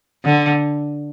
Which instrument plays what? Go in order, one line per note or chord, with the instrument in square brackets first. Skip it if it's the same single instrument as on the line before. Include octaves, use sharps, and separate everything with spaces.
[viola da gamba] D3